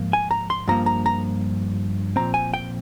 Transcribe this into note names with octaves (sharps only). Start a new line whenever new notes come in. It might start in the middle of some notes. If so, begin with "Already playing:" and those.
Already playing: G#2 F3 A#3
G#5
A#5
C6
G2 F3 A#3 A#5
A#5
A#5
A#2 F3 C4 A#5
G#5
G5